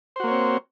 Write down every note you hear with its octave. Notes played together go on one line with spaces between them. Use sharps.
A#3 C4 F#4 C5 C#5